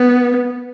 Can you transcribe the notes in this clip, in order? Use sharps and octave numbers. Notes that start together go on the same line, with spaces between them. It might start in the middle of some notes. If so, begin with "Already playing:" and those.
Already playing: B3